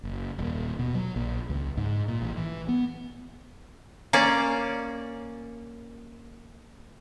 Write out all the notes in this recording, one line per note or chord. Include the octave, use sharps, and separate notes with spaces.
F#1
D#1
B2
F#3
A#1
C#2
G#2
A#2
A1
E3
B3
A#3 C#4 D5